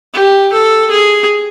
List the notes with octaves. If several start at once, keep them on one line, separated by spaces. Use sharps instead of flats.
G4
A4
G#4